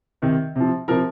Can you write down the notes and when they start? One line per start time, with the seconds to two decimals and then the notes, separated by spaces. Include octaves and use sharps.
0.22 C3 D#3
0.56 C3 F3
0.88 C3 F3 A#4 A#5